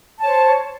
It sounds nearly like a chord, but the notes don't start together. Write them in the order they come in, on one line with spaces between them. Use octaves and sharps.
A5 C#5 C5